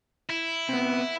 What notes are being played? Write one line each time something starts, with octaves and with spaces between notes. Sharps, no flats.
E4
C3 B3